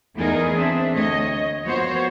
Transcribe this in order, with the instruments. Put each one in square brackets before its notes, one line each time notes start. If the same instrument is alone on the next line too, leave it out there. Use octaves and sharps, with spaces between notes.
[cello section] E2 A3 B3 D#4 G#4 A#4
C4 D4 E5
D2 C#5 D#5
F3 A#3 B3 F#4 C5 C#5